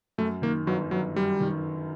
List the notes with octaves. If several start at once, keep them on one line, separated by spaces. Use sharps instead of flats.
F#2 A3
D#3 A#3
G1 F#3
G1 F#3
F#2 G3
D#3